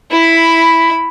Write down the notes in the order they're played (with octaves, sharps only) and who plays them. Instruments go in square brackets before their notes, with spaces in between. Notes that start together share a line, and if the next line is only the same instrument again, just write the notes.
[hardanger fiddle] E4 B5